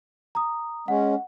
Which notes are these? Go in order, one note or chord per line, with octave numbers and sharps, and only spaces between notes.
A#5 D#6
G#3 C#4 F#5